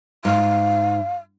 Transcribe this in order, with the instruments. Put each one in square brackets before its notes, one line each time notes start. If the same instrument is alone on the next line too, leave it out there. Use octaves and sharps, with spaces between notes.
[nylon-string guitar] G#2 [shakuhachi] F5